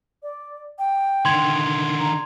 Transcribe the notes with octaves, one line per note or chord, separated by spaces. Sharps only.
D5
G5
D3 D#3 C6 G#6 F7
A#5